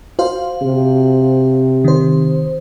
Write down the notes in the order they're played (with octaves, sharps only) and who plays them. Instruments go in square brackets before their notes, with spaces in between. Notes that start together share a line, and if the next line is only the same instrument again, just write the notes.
[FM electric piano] F#4 C5 F5
[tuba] C3
[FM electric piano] D#3 C5